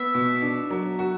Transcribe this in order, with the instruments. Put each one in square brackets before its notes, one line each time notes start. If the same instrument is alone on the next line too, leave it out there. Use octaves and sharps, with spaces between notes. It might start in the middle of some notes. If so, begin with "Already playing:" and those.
Already playing: [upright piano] B3 [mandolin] E5
[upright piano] B2
D4
F#3
F#4